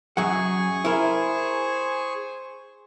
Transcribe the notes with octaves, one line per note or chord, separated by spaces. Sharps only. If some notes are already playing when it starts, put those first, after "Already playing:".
F#2 F#3 G#4 F#5 G#5 C#6
E4 A#4 C5